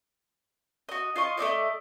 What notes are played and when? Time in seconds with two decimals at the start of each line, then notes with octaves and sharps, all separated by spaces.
0.89 F#4 D#5
1.16 F4 D#5 C#6
1.37 A3 C4 D5 D#5